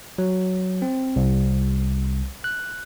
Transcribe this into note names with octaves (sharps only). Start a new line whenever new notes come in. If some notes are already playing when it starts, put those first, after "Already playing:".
F#3
C4
C2
F#6